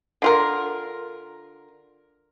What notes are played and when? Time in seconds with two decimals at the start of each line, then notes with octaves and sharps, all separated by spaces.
0.22 D3 F4 A#4